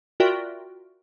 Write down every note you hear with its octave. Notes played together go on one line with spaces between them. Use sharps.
F4 F#4 A#4 D5 E5 G5